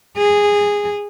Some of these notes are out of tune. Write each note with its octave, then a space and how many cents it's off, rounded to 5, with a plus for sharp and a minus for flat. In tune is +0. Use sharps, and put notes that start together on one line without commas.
G#4 -15